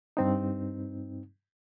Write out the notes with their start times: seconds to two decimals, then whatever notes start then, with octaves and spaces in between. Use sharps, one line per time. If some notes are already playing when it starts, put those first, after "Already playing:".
0.17 G2 C4 D#4